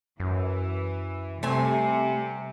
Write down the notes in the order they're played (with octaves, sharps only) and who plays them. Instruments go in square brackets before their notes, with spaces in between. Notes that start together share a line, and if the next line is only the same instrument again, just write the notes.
[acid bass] F#2 [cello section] E3
[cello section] C3 G3 [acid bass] A3 [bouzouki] C4 G#5